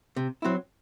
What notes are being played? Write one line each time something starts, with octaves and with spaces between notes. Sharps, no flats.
C3
F#3 C4 E4